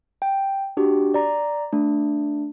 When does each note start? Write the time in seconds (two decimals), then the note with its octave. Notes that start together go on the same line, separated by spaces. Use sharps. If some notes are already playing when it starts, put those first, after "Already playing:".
0.22 G5
0.77 D4 F#4 G4
1.14 D5 A#5
1.73 A3 D4